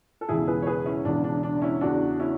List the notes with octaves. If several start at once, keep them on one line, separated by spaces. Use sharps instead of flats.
A4
E1 E2 C#3 E4 G#4
G#4 B4
C#5
G#4 B4
C#4 E4
E1 E2 C#3 D4
D4
D4
C#4 E4
E2 C#3 E3 D4 F#4
C#4 E4